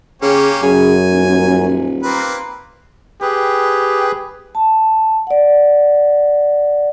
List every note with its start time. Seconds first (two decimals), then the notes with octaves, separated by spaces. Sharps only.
0.22 C#3 A#3 C#4 G4
0.63 F#2 C#3 G#5
1.11 D#1
2.03 A#3 C4 B4
3.22 G4 G#4 B4
4.55 A5
5.27 D5 F#5